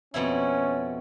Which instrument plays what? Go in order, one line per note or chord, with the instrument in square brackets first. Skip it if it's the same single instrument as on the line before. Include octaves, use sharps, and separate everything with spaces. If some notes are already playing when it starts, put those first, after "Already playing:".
[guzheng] F2 B2 E4 [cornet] C#4